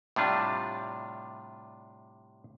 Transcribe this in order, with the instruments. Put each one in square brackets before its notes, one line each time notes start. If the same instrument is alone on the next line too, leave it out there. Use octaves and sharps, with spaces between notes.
[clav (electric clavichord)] A2 C3 G3 D4 F4